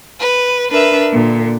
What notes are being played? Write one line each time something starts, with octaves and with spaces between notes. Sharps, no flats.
B4
D4 A#4 B4 E5
A#2 D3